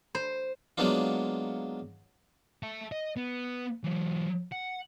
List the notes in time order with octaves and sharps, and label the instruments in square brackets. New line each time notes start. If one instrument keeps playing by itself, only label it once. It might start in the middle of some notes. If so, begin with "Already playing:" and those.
[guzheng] C5
[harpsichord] F#3 G#3 A#3 B3 D4 F4
[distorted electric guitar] E5 A5
D#5
B3
E3 F#3
F#5